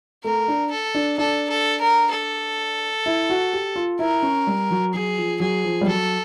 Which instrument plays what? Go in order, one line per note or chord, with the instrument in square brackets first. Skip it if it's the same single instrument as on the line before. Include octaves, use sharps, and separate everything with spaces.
[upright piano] A3 [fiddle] A#4
[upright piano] D4
[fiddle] A4
[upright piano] D4
[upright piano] D4 [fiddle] A4
[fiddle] A4
A#4
A4
[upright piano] E4
F#4
G4
F4
[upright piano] E4 [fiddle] A#4
[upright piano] C#4
G3
F#3
[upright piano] F#3 [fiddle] G#4
[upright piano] F3
[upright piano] F#3 [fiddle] G#4
[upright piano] F3
G3
[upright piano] F#3 [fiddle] A4